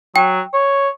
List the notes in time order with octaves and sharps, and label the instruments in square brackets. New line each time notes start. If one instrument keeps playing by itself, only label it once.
[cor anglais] F#3 [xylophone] G5
[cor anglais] C#5